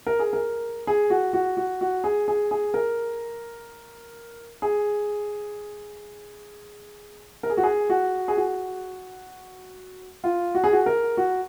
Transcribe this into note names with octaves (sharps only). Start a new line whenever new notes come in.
A#4
G#4
A#4
G#4
F#4
F#4
F#4
F#4
G#4
G#4
G#4
A#4
G#4
A#4
G#4
F#4
G#4
F#4
G#4
F#4
F4
F#4
G#4
F#4
A#4
F#4